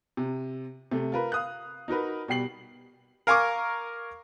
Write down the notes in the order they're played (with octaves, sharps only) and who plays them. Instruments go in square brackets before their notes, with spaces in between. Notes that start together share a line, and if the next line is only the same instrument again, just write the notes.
[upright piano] C3
C3 A3
F4 A#4 B4
F5 D#6 F#6
D#4 F#4 A#4 B4
B2 G3 G5 C7 F#7
[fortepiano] A#4 F5 G#5 A#5 C#6 D6